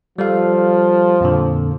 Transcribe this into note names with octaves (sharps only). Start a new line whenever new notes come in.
F3 G3 A4 F5
F2 A#2 D3